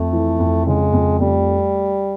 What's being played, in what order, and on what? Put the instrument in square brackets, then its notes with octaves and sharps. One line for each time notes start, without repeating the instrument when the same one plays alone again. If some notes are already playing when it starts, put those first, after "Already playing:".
Already playing: [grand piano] F2 [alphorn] A3
[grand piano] E3
F2
[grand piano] C#3 [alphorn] G#3
[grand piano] F2
[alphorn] G3 [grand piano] A3